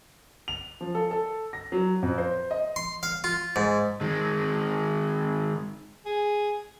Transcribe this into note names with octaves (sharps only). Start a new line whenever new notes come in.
F7
F3
A4
A4
A#6
F#3
F2
C5
D#5
C6
F5
F4
G#2
D#3 G#3
G#4